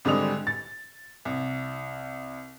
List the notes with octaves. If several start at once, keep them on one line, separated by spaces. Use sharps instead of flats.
G#1 D3 G3 G#3 D#6 F7
A6
C2